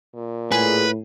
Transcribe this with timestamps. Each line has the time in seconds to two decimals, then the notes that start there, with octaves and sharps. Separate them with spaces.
0.15 A#2
0.52 A2 G#4 B4